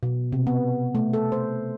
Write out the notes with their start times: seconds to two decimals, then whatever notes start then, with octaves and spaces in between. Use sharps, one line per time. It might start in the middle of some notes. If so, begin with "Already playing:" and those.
0.03 B2
0.32 C3
0.47 B3
0.95 A3
1.13 A4
1.32 C5